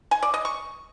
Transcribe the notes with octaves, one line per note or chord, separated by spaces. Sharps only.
G#5
D5
D#5
C#6